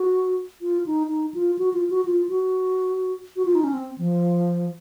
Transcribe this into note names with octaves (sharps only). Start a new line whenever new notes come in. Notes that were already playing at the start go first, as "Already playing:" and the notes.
Already playing: F#4
F4
D#4
D#4
F4
F#4
F4
F#4
F4
F#4
F#4
F4
D#4
C#4
C4
F3